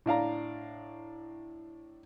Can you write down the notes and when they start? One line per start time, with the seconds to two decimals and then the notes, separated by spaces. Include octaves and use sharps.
0.06 A2 D4 F5 A#5